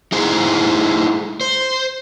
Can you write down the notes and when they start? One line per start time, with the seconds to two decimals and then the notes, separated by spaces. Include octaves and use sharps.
0.12 D#4 E4 G#4 C5
1.41 C5